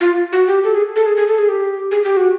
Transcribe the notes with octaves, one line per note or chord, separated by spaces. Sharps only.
F4
F#4
G4
A4
G#4
A4
G#4
G#4
A4
G#4
G4
G#4
G4
F#4